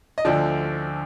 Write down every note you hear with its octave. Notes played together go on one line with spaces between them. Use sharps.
D#5
D2 D3 F3 D5